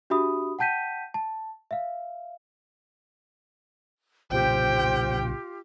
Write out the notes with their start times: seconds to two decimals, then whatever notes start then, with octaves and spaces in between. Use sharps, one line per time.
0.10 D4 F#4 G4 E5 B5 D#6
0.59 F#5 G5 A5 G6 B6 D#7
1.14 A5
1.71 E5 F5
4.31 B1 A#2 C#3 F4 G4 C5 G5